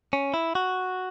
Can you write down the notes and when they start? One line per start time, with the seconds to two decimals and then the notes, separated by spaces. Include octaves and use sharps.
0.13 C#4
0.34 E4
0.55 F#4